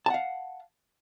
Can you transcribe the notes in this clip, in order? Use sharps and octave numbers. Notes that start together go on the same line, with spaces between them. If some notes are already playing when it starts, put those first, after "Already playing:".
F5 F#5 A5